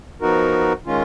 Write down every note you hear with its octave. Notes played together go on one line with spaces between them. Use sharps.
F3 B3 D#4 F#4 A#4
D#3 G#3 C#4 F4